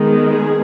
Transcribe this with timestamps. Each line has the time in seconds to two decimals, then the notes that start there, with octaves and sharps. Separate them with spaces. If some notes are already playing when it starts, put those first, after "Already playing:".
Already playing: D#3 G#3 B3
0.30 G#4